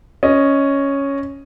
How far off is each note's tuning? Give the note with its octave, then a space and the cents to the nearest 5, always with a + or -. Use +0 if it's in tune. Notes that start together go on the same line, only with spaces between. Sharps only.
C#4 +0 D#5 +0